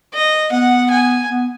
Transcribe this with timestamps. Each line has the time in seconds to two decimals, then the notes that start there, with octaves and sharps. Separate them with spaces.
0.14 D#5
0.52 B3 F#5
0.91 G#5
1.29 B3